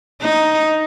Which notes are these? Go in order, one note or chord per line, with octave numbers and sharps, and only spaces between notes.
D#4